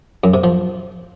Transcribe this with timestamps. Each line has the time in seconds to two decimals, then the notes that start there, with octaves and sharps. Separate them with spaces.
0.24 F#2
0.34 C3
0.44 F3